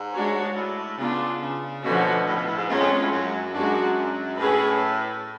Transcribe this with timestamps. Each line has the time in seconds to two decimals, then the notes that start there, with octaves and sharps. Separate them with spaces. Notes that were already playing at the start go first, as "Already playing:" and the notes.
Already playing: G#2
0.13 G#3 D4 F#4 C#5
0.55 A2
0.98 C#3 B3 D4 F4
1.42 C#3
1.84 B2 D3 F3 A3 C#4 F#4
2.27 A2
2.37 B2
2.47 A2
2.58 G#2
2.69 F#2 G#3 C#4 F4
2.80 F2
3.01 A2
3.12 F#2
3.54 F#2 G#3 D4 F#4
4.40 A2 C#4 G#4 B4